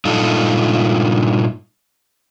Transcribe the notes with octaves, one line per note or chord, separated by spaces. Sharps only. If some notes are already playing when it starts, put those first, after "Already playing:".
G2 A#2 D#4 F4 A4